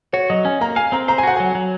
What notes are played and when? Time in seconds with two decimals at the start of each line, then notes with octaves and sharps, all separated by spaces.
0.13 F#4 C#5
0.30 F#3 D#5
0.45 C#4 G#5
0.61 A#3 A#5
0.76 F5 G#5
0.92 C4 A#5
1.08 C5 A#5
1.18 G#5
1.23 F#4 F#5
1.36 F#3 G#5
1.55 F#3